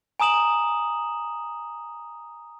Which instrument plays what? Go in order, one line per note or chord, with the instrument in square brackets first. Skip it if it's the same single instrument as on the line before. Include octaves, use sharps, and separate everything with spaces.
[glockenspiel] G#5 A#5 D#6 E7 F#7